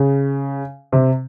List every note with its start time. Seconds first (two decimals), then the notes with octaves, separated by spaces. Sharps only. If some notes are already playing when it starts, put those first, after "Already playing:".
Already playing: C#3
0.92 C3